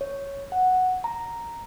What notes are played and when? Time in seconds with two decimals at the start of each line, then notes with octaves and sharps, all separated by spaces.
0.01 C#5
0.52 F#5
1.04 A#5